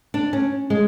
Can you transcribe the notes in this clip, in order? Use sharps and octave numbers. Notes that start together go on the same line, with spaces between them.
D4
C#4
G#3